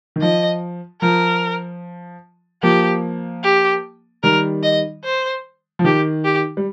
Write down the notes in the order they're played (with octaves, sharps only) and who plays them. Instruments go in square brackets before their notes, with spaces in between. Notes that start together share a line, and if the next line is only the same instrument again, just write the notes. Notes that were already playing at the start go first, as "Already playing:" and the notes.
[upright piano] D#3
[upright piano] F3 [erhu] D#5
[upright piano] F3 [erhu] A#4
[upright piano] F3 A#3 [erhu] G4
[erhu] G4
[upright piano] D#3 G3 [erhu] A#4
[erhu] D#5
C5
[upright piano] F3
[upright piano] D#3 [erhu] G4
[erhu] G4
[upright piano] G3